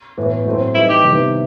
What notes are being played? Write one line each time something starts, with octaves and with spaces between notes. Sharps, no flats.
A2 E3 B3 E4
A2 F#3 A3 C4
E3 G3 D#4 E4
G4
C3 D#3 G3 B3 E4